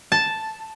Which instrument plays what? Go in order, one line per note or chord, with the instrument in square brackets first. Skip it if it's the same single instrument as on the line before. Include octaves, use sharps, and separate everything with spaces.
[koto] A5